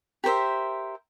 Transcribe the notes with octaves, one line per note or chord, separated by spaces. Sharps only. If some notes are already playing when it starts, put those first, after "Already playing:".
G4 A#4 C5 E5